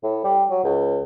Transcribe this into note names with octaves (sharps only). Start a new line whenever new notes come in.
A2
G3
F#3
C#2